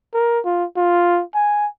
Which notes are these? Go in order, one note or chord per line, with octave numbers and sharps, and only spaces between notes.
A#4
F4
F4
G#5